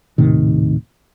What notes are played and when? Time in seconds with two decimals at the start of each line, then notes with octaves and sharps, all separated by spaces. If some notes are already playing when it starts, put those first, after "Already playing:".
0.18 D#1 A2 C3 D#3